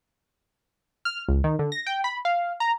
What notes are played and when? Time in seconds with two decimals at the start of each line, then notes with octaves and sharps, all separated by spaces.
1.05 F6
1.29 C#2
1.44 D#3
1.59 D3
1.72 A#6
1.86 G5
2.04 B5
2.25 F5
2.60 A#5